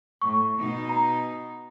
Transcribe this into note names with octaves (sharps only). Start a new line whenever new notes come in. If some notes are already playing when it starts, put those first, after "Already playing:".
A2 C#6
B2 D#4
A#5